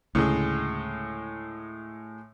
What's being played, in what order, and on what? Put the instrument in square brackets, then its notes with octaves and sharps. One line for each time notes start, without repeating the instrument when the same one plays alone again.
[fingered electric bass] D2 C#3 [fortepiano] A2 G#3